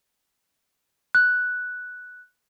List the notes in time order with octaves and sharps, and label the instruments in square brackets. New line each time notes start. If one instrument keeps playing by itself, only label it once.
[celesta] F#6